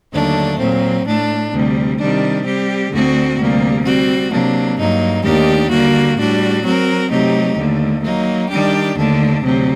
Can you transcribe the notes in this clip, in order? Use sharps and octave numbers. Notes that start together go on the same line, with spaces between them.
D#2 D3 F#3 A3 D4
A#2 F#3 C4
A2 A3 D4
D2 C3 G3
C3 D#3 G3 D4
G3 C4 G4
D2 D3 A3 C4 F#4
D2 C3 G3 A#3
G3 C4 F#4
C3 F#3 A#3 D4
G2 F#3 A#3 D#4
D#2 D#3 A3 D4 G4
D3 G3 A#3 F#4
A2 G3 D4 F#4
F#3 C4 F#4 A#4
C3 F#3 A3 D#4 G4
D#2 D3 A3
F#3 A#3 D#4
D#3 G3 D4 G4
D#2 D3 A3 D4
D2 C3 F#3